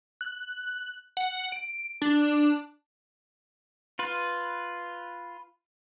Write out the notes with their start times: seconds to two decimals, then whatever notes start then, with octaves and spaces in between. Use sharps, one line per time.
0.21 F#6
1.17 F#5
1.52 D7
2.02 D4
3.99 F4 B4